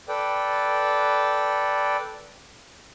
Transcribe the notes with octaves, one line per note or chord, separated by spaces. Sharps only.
A4 B4 D5 G5